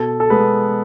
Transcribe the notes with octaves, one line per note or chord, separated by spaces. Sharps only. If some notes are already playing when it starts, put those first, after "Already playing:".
Already playing: B2 A4
A4
G#3 B3 B4